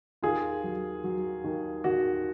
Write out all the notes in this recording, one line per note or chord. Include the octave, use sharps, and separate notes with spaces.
D#2 F4 G#4
F#3
F#3
D#2
D#2 F#4